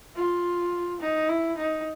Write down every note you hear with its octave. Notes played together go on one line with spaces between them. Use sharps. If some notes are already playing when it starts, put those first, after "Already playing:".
F4
D#4
E4
D#4